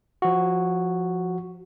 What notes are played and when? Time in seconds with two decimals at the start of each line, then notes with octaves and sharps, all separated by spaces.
0.22 F3 F#4